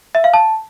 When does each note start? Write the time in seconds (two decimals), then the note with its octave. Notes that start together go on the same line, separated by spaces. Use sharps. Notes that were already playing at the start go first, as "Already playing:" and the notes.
0.15 E5
0.24 F5
0.34 A5